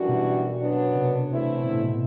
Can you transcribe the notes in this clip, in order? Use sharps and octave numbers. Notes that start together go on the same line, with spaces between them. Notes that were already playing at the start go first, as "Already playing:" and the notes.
Already playing: F#2 E3 G3 D4 F#4
B2
F#2 F#3 B3 D4
C3
E2 D3 A3 C4 E4
B2
A2
B2